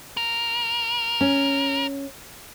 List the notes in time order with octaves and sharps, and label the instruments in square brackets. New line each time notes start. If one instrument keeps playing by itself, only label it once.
[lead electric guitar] A#4
[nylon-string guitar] C#4